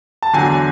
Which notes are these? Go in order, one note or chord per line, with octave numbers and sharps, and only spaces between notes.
A5
E2 D3 F#3 G#5